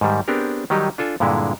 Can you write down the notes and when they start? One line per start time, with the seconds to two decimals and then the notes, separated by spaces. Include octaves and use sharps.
0.01 G#2 D#3 G3
0.28 B3 C4 D4 G4 G#4 A#4
0.70 D#3 F#3 G3 D#4 G4 D#5
0.98 D4 F4 A4 G#5
1.20 G2 A#2 D3 G#3 E4